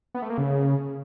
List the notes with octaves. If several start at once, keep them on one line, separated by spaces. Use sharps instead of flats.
B3
A3
A#3
C#3